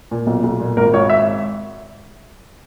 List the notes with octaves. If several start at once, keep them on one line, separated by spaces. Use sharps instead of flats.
A#2
B1
B1
A#2
G#1 A#4
G#1 C#5
E5